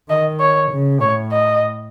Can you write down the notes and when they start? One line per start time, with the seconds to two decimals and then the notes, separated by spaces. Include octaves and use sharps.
0.10 D#3 D#5
0.40 C#5
0.71 C#3
1.01 A2 C#5
1.32 D#5